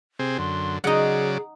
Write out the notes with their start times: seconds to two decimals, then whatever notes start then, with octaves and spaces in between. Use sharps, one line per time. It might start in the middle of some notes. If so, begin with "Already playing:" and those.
0.19 C3 C4 G#4
0.38 F#2 D3 C6
0.84 C#3 F#3 D#4 G#4 D5 F#5